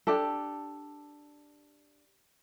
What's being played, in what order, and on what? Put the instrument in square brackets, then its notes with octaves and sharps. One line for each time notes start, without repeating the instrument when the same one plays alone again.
[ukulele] D4 G4 A4